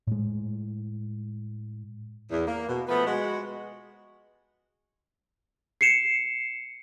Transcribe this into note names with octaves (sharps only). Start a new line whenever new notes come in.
A2 G#3
E2
A#3
B2
F3 A3 B3
G#3 F#4
C7 C#7 E7